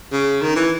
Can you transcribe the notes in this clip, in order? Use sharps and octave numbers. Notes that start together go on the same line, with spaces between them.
C#3
D#3
E3